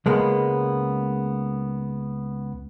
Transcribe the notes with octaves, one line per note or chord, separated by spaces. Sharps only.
C#2 G#3 A#3 B3